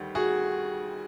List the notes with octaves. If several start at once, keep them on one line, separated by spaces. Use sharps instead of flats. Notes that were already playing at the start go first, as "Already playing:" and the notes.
Already playing: D2 D#3 G3
F#4 G#4